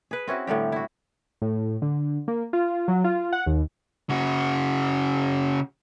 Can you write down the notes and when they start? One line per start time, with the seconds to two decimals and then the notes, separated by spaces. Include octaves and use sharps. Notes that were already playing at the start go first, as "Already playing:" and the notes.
0.11 G#4 B4
0.27 C4 C#4 E4 F#4
0.47 A2 D3 G3 G4
0.72 E4 F#4
1.42 A2
1.82 D3
2.28 A#3
2.53 F4
2.88 F#3
3.04 F4
3.32 F#5
3.46 D#2
4.09 C#3 F#4